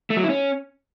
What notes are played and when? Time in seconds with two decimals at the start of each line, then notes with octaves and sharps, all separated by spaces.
0.10 A3
0.17 F#3
0.23 E4
0.30 C#4